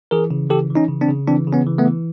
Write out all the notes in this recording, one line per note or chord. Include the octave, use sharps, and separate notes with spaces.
E3 G#4 A#4
C#3
E3 G4 A4
E3
C#4 D#4
C#3
C4 D4
C#3
E3 C4 D4
C#3
B3 C#4
E3
A3 B3
E3